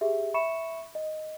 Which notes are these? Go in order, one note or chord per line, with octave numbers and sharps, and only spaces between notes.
G4 G#4 E5
E5 B5 C#6 C#7 E7
D#5